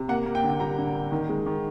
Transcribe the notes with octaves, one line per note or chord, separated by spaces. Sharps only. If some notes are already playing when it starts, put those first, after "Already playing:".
Already playing: C3
A#3 F#5
A#3
G5
D3
G3 A#5
D3
A#3
D#3
G#3
D#3